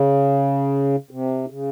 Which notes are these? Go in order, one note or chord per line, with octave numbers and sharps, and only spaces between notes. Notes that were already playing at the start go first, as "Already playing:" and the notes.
Already playing: C#3
C3
C#3